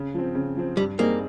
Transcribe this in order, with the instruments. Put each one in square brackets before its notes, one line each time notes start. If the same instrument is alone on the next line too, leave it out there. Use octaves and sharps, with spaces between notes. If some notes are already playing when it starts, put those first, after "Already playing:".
Already playing: [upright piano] C#3
F3 C4
C#3
F3 C4
[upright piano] G2 [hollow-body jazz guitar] G3
[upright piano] G3 C4 D#4 G#4 [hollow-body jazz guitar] A#3